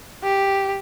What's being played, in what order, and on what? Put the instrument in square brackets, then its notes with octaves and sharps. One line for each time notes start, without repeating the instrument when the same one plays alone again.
[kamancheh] G4